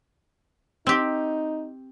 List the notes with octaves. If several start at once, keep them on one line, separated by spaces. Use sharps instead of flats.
C4 D#4 G4